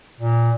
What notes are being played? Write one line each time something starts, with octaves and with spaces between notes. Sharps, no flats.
A#2